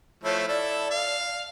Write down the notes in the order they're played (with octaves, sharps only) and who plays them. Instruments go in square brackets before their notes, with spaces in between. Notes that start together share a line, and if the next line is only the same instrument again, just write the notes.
[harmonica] F3 A3 E4 [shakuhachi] C#5
[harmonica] E4 A4 [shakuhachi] D5
[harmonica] F5